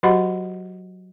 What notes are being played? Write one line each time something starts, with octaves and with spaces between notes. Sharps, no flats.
F#3 F#4 G4 D#5 F#5 B5